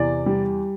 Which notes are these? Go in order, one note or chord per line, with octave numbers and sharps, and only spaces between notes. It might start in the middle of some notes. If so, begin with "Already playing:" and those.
Already playing: E2 C3 D5
G3